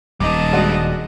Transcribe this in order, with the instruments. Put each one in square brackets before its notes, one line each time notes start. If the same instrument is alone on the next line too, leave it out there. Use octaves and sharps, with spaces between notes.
[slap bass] D#1 [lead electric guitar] G3 D#4 [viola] D#5 A5 [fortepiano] D6
[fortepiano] G#3 D4 F#4